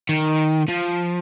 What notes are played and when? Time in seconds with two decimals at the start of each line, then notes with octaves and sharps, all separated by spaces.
0.09 D#3
0.68 F3